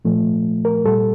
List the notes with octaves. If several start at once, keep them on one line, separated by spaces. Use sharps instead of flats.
A#2 F3 A3
A#4
A#2 G3 A4